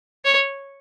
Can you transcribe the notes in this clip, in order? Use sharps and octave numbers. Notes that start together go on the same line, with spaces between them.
C#5